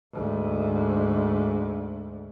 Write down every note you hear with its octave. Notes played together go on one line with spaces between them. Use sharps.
D2 G#2